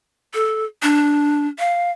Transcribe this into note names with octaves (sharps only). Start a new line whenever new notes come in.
A4
D4
F5